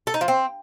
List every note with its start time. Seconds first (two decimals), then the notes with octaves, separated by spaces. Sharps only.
0.07 A4
0.14 D#4
0.21 F3
0.28 C4